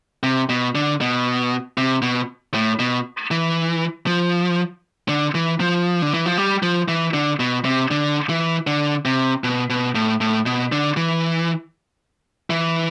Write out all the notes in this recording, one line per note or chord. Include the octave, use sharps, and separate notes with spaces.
C3
B2
D3
B2
C3
B2
A2
B2
E3
F3
D3
E3
F3
D3
E3
F3
G3
F3
E3
D3
B2
C3
D3
E3
D3
C3
B2
B2
A2
A2
B2
D3
E3
E3